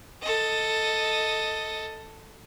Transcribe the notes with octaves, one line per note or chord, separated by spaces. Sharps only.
A4 D#5